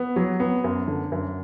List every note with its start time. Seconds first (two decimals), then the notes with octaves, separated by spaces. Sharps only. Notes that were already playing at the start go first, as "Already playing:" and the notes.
Already playing: B3
0.16 F#3
0.40 B3
0.64 F#2
0.88 D3
1.12 F#2